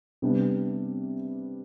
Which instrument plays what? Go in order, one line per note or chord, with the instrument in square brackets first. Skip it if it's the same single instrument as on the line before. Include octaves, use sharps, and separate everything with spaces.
[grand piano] C3 G3 B3 D4